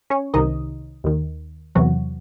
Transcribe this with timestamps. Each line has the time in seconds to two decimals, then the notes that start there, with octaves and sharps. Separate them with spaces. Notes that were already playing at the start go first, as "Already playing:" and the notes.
0.10 C#4 C#5
0.34 C2 C3 D#3 D#4 D#5
1.04 D#2 D#3
1.75 E2 C3 E3 F#3 F#4